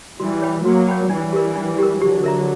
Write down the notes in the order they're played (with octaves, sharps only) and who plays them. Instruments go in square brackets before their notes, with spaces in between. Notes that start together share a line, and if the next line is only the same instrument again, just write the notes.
[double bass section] E3 G3 [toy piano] F#4
[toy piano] C#5 G5 B5
[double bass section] F#3 A#3 [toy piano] F#4
[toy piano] C#5 G5 B5
[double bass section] E3 G3 [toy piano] D4
[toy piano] G4 A#4
D4
G4 A#4
[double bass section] D3 F#3 [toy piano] G4
[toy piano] A#4 E5 A#5